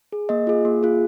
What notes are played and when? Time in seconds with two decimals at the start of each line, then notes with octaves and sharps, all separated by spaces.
0.12 G#4
0.29 A#3 D#5
0.47 F4 G#4
0.65 A#3
0.83 F4 G#4